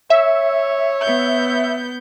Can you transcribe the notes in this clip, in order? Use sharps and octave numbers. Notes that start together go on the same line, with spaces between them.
C#5 E5
B3 G6